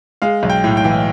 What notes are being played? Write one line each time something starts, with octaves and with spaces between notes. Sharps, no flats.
G#3 F5
B1
G5
A2
G5
E3